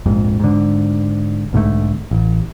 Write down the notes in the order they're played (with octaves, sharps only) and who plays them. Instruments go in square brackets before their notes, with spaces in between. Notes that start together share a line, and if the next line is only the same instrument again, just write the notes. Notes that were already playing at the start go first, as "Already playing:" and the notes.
[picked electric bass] A#1 F2 G#2
G#2 D3
B1 G#2 D3 A3
A1